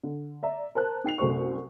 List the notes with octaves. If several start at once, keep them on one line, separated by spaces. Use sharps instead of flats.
D3
D5 E5 A#5
A#4 C5 A5 F#6
D#4 G5 C7 F7
C2 F#2 A3 C5 C#6